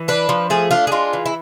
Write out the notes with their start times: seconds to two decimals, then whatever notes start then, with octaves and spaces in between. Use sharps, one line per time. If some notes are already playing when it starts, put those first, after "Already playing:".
Already playing: E3
0.08 D4 B4
0.29 F3
0.50 A3 G#4
0.71 D4 F4
0.87 G#4
0.92 G#3 F4
1.13 E3
1.26 E4